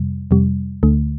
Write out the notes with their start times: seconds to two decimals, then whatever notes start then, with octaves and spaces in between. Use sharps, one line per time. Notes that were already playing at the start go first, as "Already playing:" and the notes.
Already playing: F2 C3 G3
0.31 F2 C3 G3
0.83 D2 D3 A3